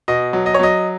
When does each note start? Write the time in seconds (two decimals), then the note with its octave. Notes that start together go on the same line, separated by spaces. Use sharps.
0.08 B2 D#5
0.33 F#3
0.46 D#5
0.54 C#5
0.59 F#3 D#5